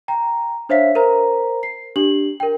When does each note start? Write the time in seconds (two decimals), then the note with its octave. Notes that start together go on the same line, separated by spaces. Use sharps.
0.08 G5 A#5
0.69 D4 C5 C#5 E5 F5 B6
0.95 A#4 C5 A#5
1.63 C7
1.96 D4 G4 F#7
2.40 A#4 G5